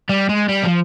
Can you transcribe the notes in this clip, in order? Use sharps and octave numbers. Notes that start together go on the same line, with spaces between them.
G3
G#3
G3
F3